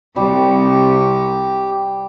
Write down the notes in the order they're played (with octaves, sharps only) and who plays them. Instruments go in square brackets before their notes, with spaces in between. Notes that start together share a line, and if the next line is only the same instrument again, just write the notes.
[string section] C2 [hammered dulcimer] G3 [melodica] G4